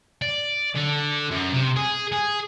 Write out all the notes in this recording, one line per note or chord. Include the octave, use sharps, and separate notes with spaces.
D5
D3
F#2
C3
G#4
G#4